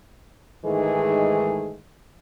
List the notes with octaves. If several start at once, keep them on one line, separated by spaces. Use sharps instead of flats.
G#2 D#3 E3 G#3 A3 G#4